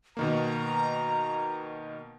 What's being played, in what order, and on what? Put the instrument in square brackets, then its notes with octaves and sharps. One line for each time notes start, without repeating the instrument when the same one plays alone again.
[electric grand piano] B2 D#3 A#3 [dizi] A#5